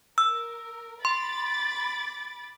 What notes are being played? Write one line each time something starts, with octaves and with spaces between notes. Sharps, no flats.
A#4 E6
B5 C6 D6 A6